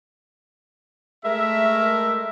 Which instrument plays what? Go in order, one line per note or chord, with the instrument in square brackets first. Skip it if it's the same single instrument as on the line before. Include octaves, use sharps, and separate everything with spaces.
[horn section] G#3 A3 A#4 E5